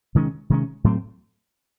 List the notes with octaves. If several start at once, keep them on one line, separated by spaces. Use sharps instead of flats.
C3 D#3 G#3 C#4
C3 D#3 G#3 C#4
A2 F#3 A3 C4